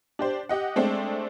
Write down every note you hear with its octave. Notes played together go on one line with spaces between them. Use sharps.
D4 G4 C5
G4 D#5 F#5
G#3 A3 C4 D4